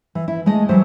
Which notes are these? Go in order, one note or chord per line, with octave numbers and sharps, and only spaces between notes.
E3
E4
G#3 A3 D#5
E3 F#3 G3 G4 C5